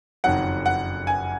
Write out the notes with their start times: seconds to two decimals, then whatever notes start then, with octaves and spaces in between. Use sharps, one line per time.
0.24 F#1 F2 D#3 F#3 F#5
0.66 F#5
1.07 G#5